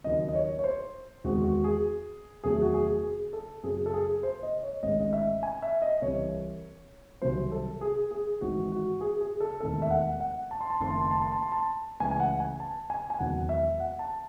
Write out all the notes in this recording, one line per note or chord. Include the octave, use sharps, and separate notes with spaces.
D#2 C#3 F#3 C4 D#5
D#5
C#5
C#5
C5
E2 D#3 G#3 C4 F#4
F#4
G#4
E2 C3 D#3 F#3 A3 G#4
F#4
G#4
G#4
A4
F#2 C#3 F#3 C4 G#4
A4
G#4
C5
D#5
C#5
A1 G#2 D#3 G#3 C4 D#5
D#5
E5
G#5
E5
D#5
C2 C3 E3 C#5
C2 C3 D#3 F#3 C5
A4
G#4
G#4
G#1 G#2 E3 C4 F#4
F#4
G#4
G#4
A4
E1 D#2 D#3 A3 C4 A4
E5
F#5
F#5
A5
C6
A5
F#1 F#2 D#3 A3 C4 C6
A5
C6
A5
C6
A5
C6
A5
C#2 C#3 E3 A3 G#5
G#5
F#5
G#5
A5
G#5
G#5
E1 E2 D#3 F#3 C4 F#5
E5
F#5
A5